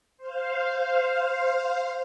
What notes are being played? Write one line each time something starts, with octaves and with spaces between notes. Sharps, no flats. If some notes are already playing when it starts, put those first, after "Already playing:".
C5 F5